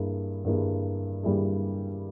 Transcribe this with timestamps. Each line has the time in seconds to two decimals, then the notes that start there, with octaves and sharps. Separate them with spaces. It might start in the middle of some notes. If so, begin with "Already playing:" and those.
Already playing: G2 G3 A#3 E4 G#4
0.44 G2 G3 A#3 E4 G#4
1.23 G2 G3 A#3 E4 G#4